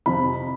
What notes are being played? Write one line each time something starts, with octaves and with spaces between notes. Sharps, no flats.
F2 C3 F3 B5